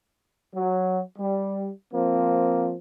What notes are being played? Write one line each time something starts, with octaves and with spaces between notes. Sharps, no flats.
F#3
G3
F3 A#3 C4